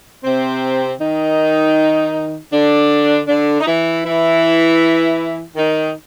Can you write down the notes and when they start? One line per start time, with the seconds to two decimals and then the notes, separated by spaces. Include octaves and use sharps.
0.24 C3 C4
0.99 D#3 D#4
2.51 D3 D4
3.27 D3 D4
3.60 D#4
3.66 E3 E4
4.04 E3 E4
5.56 D#3 D#4